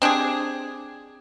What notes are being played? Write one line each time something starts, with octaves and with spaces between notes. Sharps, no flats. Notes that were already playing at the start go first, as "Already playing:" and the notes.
C4 D4 G4 G#4